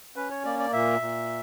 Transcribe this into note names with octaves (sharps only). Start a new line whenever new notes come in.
C#4 B4
C#5
A#3 D5
D5
A#2 E5
A#2